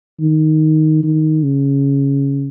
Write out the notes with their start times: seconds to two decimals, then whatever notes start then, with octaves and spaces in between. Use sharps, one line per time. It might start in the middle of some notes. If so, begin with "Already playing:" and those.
0.20 D#3
1.03 D#3
1.43 C#3